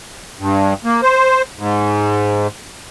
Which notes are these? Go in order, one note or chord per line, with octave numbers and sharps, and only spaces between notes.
G2
A#3
C5
G#2